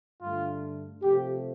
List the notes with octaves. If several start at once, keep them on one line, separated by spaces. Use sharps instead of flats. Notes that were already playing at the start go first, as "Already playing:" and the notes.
G2 D3 A3 F4
C3 F3 A3 G4